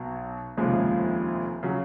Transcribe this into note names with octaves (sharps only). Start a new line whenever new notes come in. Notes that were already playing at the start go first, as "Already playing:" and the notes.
Already playing: B1 B2 F#3
F1 D#2 C#3 F3 G#3
C#3 F#3